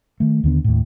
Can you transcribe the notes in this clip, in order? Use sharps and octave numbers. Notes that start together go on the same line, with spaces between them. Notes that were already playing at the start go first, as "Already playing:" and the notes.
D#3 A3
D#2 D3 B3
D#2 A2